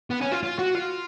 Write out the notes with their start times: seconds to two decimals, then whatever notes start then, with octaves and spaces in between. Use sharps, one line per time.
0.10 B3
0.21 C#4
0.32 F4
0.43 F4
0.59 F#4
0.75 F4